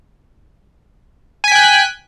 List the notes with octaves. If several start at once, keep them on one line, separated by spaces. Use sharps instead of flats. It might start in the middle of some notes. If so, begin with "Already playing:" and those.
G5 G#5 F#6 B6